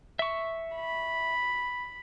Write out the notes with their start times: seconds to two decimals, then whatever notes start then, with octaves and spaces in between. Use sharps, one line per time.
0.19 E5 C#6
0.75 B5